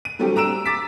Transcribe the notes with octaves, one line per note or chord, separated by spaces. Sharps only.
D#7
D3 F#3 G3 A3 C4 G4
A#5 E6 D7 E7
D6 A6 B6